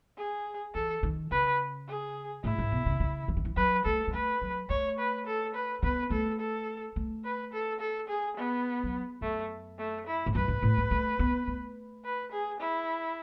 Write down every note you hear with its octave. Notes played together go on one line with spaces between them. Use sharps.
G#4
E3 A4
D#3
C#3 B4
G#4
A2 E4
G#2
B2
C#3
C#3
E3
D#3
E3
F#3 B4
A3 A4
G#3
A3 B4
F#3
A3 C#5
B4
A4
B4
B3 B4
A3 A4
A4
A3
B4
A4
A4
G#4
B3
F#3
F#2 A3
A3
E4
G#2
F#2 B4
G#2
A2
G#3
A3
B3
A3
B4
G#4
E4